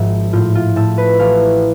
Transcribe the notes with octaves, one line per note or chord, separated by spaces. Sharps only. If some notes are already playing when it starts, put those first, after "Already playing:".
Already playing: G#1 G#2 F3 E5
A2 F4
F4
A2 A4
B4
A1 F5